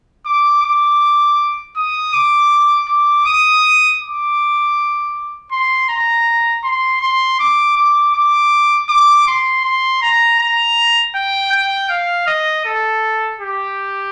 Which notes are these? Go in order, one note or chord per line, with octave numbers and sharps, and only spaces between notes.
D6
D6
D#6
D6
D6
D#6
D6
C6
A#5
C6
C6
D6
D6
D6
D6
C6
C6
A#5
A#5
G5
G5
F5
D#5
A4
G4